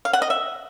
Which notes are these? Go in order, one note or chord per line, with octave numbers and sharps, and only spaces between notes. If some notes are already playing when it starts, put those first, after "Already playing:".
F5
F#5
D#5
E5